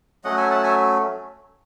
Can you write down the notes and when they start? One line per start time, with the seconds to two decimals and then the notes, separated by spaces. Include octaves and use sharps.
0.24 F#3 A3 C#4 D#5 F#5
0.37 E5 G#5
0.50 F#5 A5
0.64 E5 G#5